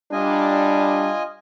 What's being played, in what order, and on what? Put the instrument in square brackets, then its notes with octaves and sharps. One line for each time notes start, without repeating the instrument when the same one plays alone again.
[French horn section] G3 D4 [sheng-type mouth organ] F4 D#5 G#5